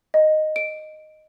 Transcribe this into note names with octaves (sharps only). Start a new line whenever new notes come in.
D#5
D7